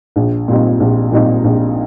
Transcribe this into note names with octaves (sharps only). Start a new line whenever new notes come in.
A#1
A#2 G3 C4 D#4
A#1
A#2 G3 C4 D#4
A#1